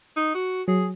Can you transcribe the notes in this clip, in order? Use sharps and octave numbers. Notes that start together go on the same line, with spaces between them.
D#4
F#4
F#3 G#4